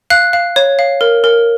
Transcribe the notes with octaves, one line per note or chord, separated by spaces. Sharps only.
F5 F#6
F5
C#5
F5
A#4
A#4